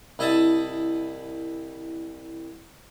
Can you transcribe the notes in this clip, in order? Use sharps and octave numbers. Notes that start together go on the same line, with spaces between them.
C2 E4 D#5 E5 A5 D#6